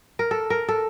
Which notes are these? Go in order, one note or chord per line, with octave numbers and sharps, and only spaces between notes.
A#4
A4
A#4
A4